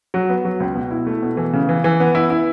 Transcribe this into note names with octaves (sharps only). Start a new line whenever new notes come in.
F#3
B3
F#3
C#2
B2
E4
A3
B2
E3
C#3
E3
E3
B3
E4
E4